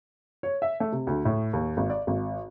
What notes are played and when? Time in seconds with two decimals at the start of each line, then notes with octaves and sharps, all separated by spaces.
0.43 C#5
0.62 E5
0.80 A3
0.92 C3
1.07 D2
1.25 A2
1.53 D#2
1.77 G#1
1.90 D5
2.07 G#1